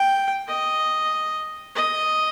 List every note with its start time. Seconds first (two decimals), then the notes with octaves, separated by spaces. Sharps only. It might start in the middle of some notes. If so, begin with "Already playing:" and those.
Already playing: G5
0.48 D#5
1.75 D#5